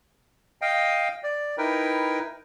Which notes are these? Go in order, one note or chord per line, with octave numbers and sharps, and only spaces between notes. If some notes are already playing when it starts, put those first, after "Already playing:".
D#5 F5 G5
D5
D#4 E4 A#4 B4 G5